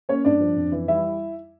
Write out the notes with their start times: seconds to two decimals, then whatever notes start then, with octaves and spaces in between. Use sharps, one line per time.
0.09 A#3 C#4 C#5
0.25 G2 D4 D5
0.40 F3
0.56 F2
0.72 E3
0.88 G3 E4 E5